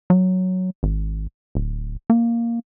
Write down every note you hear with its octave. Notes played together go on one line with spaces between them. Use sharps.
F#3
G#1
D1
A#3